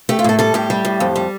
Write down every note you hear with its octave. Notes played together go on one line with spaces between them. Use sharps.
A3 G4
F4
A2 A4
G3 A4
A2 G4
G3
A2
F2
G3